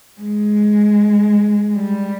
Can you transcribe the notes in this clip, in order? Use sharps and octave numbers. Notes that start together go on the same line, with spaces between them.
G#3
G3